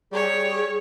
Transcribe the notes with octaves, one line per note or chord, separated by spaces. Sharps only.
G3 G#4 C#5